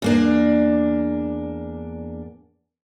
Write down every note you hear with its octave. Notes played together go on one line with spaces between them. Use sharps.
E2 A#3 D4